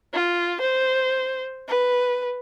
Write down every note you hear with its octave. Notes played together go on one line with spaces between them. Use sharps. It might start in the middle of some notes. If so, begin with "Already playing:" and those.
F4
C5
B4